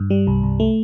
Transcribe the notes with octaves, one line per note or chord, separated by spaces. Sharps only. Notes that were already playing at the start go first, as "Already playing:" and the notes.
Already playing: G2
G3
C2
C2
A3